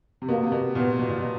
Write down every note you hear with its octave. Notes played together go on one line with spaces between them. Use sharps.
C3
B2 A#3
C3
B2
A#2 B3
B2
A#2
B2